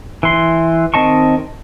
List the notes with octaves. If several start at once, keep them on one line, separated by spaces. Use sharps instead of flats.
E3 C6
D#3 C4 D#5 A5 C#6